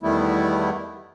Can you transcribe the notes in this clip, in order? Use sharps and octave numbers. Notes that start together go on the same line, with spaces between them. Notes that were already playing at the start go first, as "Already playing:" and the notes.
E2 D#3 G3 A3 B3 E4